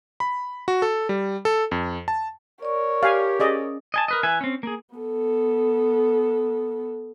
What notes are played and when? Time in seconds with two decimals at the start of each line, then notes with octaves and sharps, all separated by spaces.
0.20 B5
0.68 F#4
0.82 A4
1.09 G3
1.45 A4
1.71 F2
2.08 A5
2.62 A#4 C#5 D5 C#6
3.03 G4 F5 G#5
3.40 C#4 G#4 D5 D#5
3.94 D#5 G#5 A5
4.08 A#4 B4 D#5
4.23 E3 B4 E5 G#5
4.41 C4 C#4
4.63 A#3 G#4
4.95 B3 A4